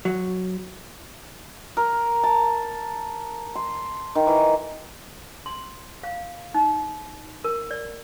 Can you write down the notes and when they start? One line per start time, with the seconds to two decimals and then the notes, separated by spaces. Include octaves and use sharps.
0.05 F#3
1.77 A#4
2.24 A5
3.55 C6
4.15 D#3
4.27 E3
5.46 C6
6.03 F5
6.54 D#4
7.44 A#4
7.71 D5